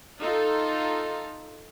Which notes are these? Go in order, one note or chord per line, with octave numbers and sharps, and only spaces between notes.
D#4 F4 A4